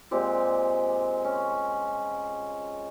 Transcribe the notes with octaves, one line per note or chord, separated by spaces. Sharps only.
A#2 G#3 C4 G4
C#4